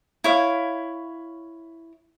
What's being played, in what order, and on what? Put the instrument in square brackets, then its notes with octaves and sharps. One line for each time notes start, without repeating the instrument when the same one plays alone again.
[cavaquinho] E4 C#5 F5